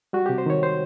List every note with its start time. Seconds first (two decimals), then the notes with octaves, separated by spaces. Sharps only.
0.13 G3 F#4
0.26 C3 G4
0.38 C5
0.46 D#3 C#5
0.63 C5